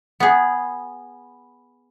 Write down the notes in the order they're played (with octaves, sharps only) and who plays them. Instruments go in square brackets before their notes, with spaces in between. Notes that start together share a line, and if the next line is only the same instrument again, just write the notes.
[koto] B3 G#4